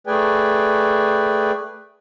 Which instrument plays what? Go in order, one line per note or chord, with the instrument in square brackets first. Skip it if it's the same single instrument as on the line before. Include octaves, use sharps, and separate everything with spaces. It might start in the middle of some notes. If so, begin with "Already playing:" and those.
[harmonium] A3 G#4 B4 D5 G5 G#5